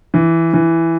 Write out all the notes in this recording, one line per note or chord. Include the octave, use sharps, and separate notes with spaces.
E3
E3